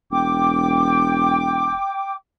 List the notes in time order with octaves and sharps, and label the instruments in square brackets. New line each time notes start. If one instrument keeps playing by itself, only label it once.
[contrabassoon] E1 [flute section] G5 D6